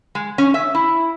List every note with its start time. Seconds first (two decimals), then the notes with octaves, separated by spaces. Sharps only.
0.15 G#3
0.38 C#4
0.54 E5
0.75 E4